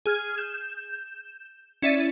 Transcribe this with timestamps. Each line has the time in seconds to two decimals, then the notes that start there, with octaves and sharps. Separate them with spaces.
0.06 G#4 F6 G#6
0.38 G6 E7
1.82 C#4 E4 D5 E5 A6 D#7